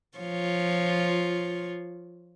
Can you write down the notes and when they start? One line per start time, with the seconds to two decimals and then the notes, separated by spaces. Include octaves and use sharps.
0.18 F3 F4 C#5